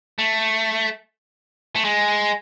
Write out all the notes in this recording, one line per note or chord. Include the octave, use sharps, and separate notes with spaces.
A3
A3
G#3